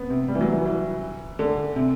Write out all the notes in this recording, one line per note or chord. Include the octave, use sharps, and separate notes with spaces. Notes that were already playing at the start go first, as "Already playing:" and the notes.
Already playing: B3 C4
C3
G3
E3
F#3
E3
E3
D3
C3